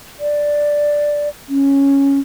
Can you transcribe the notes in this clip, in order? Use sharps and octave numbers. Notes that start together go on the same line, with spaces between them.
D5
C#4